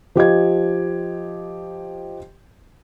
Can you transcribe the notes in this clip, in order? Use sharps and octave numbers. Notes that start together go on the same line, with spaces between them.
F3 G4 D#5 G#6